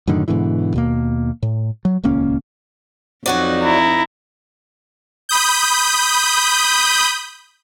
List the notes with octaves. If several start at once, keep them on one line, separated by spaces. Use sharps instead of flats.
F#2 A2 D3 D#3
G#2 B2 D3 E3
D#2 B2 A#3
A2
F#3
D#1 C#2 A#3 C#4
F2 F#3 D#4 F#4 D5
E4 A#5
B5 D#6 G6